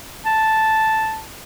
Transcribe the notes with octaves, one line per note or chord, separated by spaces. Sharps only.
A5